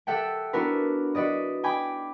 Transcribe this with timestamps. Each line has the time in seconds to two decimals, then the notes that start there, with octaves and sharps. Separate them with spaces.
0.07 G4 A4 E5 F#5 G5
0.53 B3 D4 E4 F#4 A#4 B4
1.15 F#4 B4 D5 D#5
1.64 G5 G#5 B5 D6